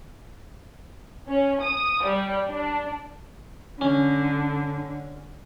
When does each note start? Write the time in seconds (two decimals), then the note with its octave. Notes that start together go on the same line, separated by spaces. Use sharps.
1.28 C#4
1.62 D#6
2.04 G3
2.47 D4
3.81 D3 C#4